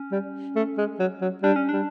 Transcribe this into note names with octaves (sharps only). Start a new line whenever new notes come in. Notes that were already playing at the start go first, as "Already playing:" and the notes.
Already playing: C#4
G3
A3
G#3
F#3
F#3
G3 D4
C#4
G3 D4